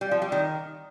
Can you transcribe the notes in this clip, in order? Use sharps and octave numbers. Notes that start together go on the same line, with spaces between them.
G3
F3
G3
D#3